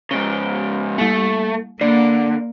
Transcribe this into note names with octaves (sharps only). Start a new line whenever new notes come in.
G#2 C#3 D7 G7
G3 A3 A#3
D3 A#3 D5